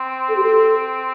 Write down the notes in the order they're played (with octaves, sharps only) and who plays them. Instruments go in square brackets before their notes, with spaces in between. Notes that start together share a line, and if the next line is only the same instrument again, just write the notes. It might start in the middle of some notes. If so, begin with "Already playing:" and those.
Already playing: [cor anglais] C4
[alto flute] A4
G4
A4